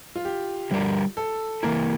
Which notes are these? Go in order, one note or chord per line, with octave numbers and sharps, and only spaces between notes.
F4
G4
D3 G3 D4 G4 A#4
A4
E3 A#3 E4 A#4